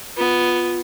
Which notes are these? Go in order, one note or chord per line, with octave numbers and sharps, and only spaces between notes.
B3 F4